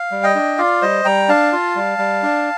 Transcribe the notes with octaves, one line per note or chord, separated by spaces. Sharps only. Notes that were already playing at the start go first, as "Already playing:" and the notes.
Already playing: F5
G3
D#5 G5
D4
F4 D5 F5
G3 C5 D#5
G3 G5 A#5
D4 F5 A5
F4
G3
G3
D4